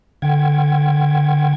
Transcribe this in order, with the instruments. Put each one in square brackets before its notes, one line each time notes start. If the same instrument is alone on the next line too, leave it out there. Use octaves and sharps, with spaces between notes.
[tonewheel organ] D3 F#5 G5 G#6